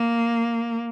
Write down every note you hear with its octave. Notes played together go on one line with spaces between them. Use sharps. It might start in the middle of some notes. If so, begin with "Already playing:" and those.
Already playing: A#3